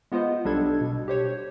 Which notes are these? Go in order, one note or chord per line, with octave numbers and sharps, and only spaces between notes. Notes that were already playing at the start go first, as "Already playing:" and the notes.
G#3 B3 F4 C5 D#5
B1 G3 D4 A4 G#6
B2
G4 C5 C#5